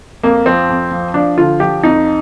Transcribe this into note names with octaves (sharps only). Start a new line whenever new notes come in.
F2 A#3
F3 C4
F2
F3
F3 D4
D3 F4
F3 G4
F2 D#4